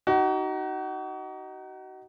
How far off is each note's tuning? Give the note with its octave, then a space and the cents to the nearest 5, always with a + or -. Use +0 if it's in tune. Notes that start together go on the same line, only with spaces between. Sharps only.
D#4 +0 F#4 +30